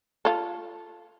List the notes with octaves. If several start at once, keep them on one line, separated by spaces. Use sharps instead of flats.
F4 A4